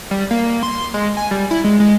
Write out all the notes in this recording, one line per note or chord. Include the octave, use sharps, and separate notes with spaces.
G3
A#3
C6
G#3
G#5
G3
E4
G#3
G#3